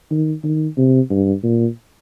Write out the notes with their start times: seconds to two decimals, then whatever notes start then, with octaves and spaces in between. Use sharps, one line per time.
0.11 D#3
0.44 D#3
0.77 C3
1.10 G2
1.43 A#2